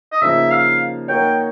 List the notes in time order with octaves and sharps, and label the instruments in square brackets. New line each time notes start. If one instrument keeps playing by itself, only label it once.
[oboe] D#5
[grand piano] C#3 F3 A#3 D#4 [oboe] E5
[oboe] F5
[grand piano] A#3 D#4 F#4 A#4 C#5 [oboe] G5